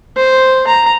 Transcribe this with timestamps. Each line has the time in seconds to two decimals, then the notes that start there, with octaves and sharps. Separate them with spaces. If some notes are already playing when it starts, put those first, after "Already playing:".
0.16 C5
0.67 A#5